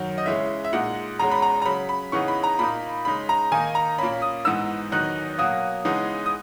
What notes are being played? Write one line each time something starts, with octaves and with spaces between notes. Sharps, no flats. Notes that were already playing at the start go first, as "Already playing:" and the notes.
Already playing: F#2 D#3 F#3
D#5
C#3 E3 G#3 C#4 E5
E5
A#2 G#3 D#4 F#5
E2 B2 G#3 C#4 A#5
B5
A#5
A#5
C#3 F#3 C#4 B5
B5
C#3 E3 B3 D#4 C#6
B5
A#5
A#2 A#3 D#4 B5
C#3 G#3 D#4 B5
A#5
D#3 A#3 D#4 G#5
A#5
A#2 A#3 C#4 B5
D#6
G#2 E3 B3 D#4 E6
E2 D#3 F#3 B3 D#4 F#6
B2 F#3 A#3 D#6
C#3 E3 G#3 B3 D#4
D#6